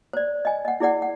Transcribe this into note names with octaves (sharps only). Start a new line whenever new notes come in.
C5 D5
D#5 G#5
D#5 F#5
E4 G#4 D5 F#5
F#5